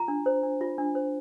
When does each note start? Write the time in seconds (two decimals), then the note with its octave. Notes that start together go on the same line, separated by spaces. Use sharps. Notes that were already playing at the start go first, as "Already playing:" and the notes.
Already playing: F4 A#5
0.08 D4
0.26 C5
0.43 D4
0.61 F4
0.78 D4
0.95 C5